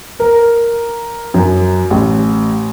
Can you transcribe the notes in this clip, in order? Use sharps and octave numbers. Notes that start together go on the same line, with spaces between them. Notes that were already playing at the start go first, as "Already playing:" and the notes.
A#4
F#2
A1